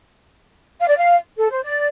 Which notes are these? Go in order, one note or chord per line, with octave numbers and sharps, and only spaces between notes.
F5
D5
F5
A4
C5
D5